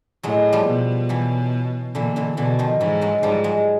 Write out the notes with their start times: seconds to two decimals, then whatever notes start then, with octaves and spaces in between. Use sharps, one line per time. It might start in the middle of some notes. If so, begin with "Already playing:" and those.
0.23 A2 F#3 G#3
0.53 F3 G3
0.67 B2
1.09 E3 F#3
1.95 A#2 D3 E3
2.16 D3 E3
2.37 B2 D3 E3
2.59 D#3 F3
2.80 G#2 E3 F#3
3.01 F#3 G#3
3.23 G#2 F3 G3
3.44 F#3 G#3